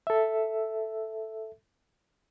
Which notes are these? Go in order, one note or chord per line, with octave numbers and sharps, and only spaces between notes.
A4 E5